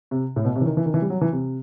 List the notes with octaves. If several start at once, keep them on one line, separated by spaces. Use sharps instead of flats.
C3
A2
B2
C3
E3
D#3
E3
D#3
E3
G3
F#3
E3
C3